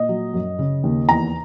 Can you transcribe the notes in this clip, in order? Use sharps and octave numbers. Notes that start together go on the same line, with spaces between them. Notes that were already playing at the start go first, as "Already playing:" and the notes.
Already playing: A#2 D#5
F#3
F#2
C#3
D#2
E2 A#5